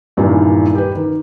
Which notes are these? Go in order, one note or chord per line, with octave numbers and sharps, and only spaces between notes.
E2 G2 A#2 D#3 E3
G4 B4
D#3